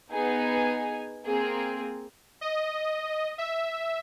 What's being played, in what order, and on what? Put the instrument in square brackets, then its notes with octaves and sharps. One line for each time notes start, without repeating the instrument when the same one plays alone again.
[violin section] B3 D#4 G#4 G#5
A#3 C4 G#4
[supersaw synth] D#5
E5